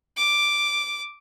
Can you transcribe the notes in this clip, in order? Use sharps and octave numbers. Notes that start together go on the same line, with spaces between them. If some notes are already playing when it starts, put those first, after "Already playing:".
D6